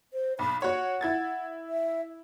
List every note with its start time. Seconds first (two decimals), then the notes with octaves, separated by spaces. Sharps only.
0.13 C5
0.39 B1 B5
0.62 F#4 C#5 F#5
1.01 E4 G#6 A6
1.69 E5